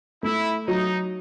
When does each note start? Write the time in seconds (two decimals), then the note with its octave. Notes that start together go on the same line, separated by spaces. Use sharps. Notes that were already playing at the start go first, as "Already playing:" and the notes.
0.23 A3 E4
0.67 F#3 D#4